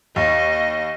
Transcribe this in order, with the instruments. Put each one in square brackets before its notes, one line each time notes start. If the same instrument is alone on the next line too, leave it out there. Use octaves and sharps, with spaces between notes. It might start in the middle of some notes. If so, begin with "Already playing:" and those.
[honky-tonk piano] D#2 [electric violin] D#5